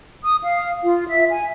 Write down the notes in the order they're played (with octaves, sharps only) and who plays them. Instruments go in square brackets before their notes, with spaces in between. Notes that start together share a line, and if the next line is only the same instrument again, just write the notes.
[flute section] D#6
F5
F4
E5
G#5